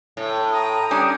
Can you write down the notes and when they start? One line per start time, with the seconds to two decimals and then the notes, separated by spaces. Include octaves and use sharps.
0.17 A2
0.52 G5 A#5 D#6
0.91 G3 C#4 D4